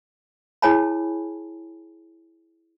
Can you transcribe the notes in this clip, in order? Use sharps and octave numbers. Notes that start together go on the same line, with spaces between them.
E4 G#4 C#5 G#5 A5 B5